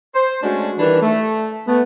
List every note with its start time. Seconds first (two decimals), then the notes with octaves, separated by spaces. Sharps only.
0.15 C5
0.43 G#3 A3 C#4 D4 F#4
0.79 D#3 E3 G3 D4 A#4 B4
1.02 A3
1.68 A3 B3